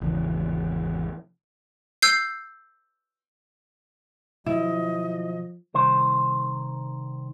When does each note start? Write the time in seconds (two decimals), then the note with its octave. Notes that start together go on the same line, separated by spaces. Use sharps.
0.01 G#1 E2 C#3 E3
2.02 E6 G6 C7
4.46 B2 D#3 F3 F#3 E4 D#5
5.74 C2 D#3 C5